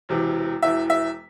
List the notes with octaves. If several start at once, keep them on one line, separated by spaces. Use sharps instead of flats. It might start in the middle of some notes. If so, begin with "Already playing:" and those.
E1 E2 C3 E3
E1 E2 E3 E5
E5